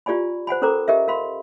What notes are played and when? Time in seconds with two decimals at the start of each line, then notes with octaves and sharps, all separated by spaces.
0.06 F4 G4 D5 G#5 B5
0.47 C5 F#5 G#5 B5
0.62 C#4 A4 A#4 C5 A#5 D6
0.88 G4 A#4 D#5 E5
1.08 A#4 F5 B5 C6